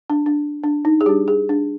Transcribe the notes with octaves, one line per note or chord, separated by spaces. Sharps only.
D4
D4
D4
D#4
G#4
G3 D4 G4
G#4
D4